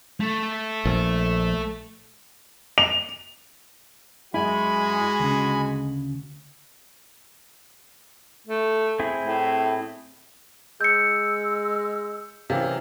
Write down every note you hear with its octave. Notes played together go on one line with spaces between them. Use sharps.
A3
A#1
F7
F#2 G#3 E4 F#4 G#5 B5
D2 C#3
A3
C4 E4 G#4
A2
G#3 E6 G6 C#7
F#2 C3 E3 F5